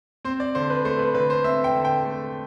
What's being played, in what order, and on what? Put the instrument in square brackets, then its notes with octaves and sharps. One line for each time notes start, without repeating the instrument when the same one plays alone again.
[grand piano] C4 C5
D5
D3 C5
B4
A3 C5
B4
D3 B4
C5
C4 E5
G5
D3
G5
A3